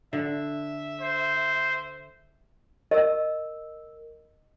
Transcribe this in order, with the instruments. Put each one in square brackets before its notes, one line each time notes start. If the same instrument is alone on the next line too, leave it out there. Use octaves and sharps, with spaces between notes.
[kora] D3 [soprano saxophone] E5
[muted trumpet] C5
[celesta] A#4 E6 [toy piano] D#5